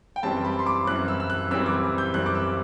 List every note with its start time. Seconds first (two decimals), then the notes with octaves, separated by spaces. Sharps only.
0.16 G5
0.23 F#2 E3 G3 C4 A5
0.44 B5
0.59 C6
0.66 D6
0.87 F#2 E3 G3 C4 F#6
1.08 E6
1.20 E6
1.30 F#6
1.50 F#2 E3 G3 C4 E6
1.66 D6
1.98 G6
2.14 F#2 E3 G3 C4 F#6
2.26 D6
2.35 E6